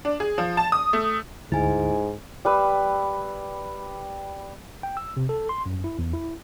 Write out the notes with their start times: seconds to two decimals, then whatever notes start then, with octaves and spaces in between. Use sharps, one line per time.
0.05 D4
0.20 G#4
0.38 F3
0.57 A5
0.72 D#6
0.93 A3
1.52 D2 G#2 E4 G#5
2.45 G3 B4 E6
4.83 G5
4.97 E6
5.17 C3
5.29 A4
5.49 C6
5.66 F#2
5.84 E4
5.99 E2
6.13 E4